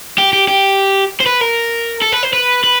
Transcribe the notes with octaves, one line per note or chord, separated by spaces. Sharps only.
G4
G4
G4
C5
B4
A#4
A4
B4
C5
B4
B4